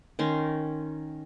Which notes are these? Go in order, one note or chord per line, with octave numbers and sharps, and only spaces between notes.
D#3 C#4 C6